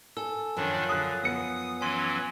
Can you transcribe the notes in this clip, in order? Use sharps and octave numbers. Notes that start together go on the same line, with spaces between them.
A4 G#5 E6
F#2 D#3 F3 D4
D3 D#6 F#6 C7
B3 D#6 C#7
E3 F#3 C#4 G#5 C6 D#7